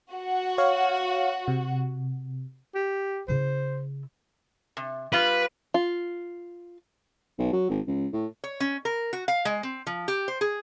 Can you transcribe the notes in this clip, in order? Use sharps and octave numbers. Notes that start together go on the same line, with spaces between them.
F#4 F#5
C#5 F5
C3
G4
C#3 E4 C5
C3
G3 F4 B4
F4
B1
F#3
G#1
C#2
A2
C#5
C#4
A#4
F#4
F5
G#3
C4
F3
G4
C5
G#4